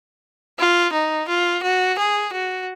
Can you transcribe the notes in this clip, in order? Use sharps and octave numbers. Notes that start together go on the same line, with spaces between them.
F4
D#4
F4
F#4
G#4
F#4